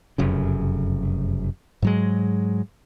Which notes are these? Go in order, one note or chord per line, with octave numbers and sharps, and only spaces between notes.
F1 F#2 C#3
G#2 F#3 G#3